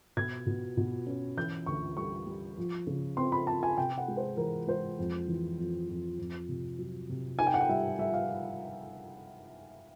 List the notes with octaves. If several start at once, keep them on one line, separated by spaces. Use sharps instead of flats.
B2 G#6
B2
B2
C#4
E3 G6
D2 C#6
G3 C#6
G3
F3
C#3
C4 C6
B5
C4 A5
G#5
C3 G5
F#5
G#3
C5
E3 A#4
G#3 C5
F2
E3
F2
F2
F2
C3
F#3
C3
D#4 G#5
G5
F#5
G5
G3 E5
G3 E5
F5